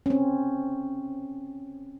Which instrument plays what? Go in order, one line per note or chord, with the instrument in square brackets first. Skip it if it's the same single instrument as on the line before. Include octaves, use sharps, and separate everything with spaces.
[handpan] C4 C#4